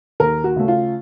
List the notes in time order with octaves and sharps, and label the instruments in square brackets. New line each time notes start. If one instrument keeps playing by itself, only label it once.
[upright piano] D#2 A#4
F#4
C#3 A3
F4